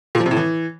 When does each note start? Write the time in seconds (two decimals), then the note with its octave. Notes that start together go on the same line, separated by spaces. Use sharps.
0.15 A#2
0.20 F3
0.26 C3
0.31 A2
0.37 E3